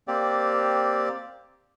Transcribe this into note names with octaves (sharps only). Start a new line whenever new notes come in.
A#3 C4 G4 D5